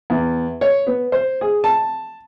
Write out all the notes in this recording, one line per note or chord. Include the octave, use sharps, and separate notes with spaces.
E2
C#5
B3
C5
G#4
A5